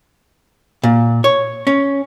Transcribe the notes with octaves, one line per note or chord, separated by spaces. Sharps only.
A#2
C#5
C#4